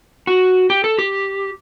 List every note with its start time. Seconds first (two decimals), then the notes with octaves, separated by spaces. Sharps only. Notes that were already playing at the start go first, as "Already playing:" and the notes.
0.27 F#4
0.70 G4
0.84 A4
0.99 G4